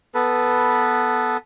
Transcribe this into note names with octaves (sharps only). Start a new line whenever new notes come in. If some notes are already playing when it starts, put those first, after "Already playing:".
B3 A4 B4